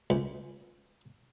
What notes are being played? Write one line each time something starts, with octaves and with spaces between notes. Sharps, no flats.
C#2